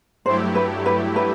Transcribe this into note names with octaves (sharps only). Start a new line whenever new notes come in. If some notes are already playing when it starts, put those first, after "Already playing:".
G2 F#3 A3 E4 G4 C5
B4
B4
B4